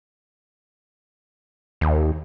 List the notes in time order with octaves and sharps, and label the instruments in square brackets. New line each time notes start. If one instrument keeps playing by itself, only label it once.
[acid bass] D#2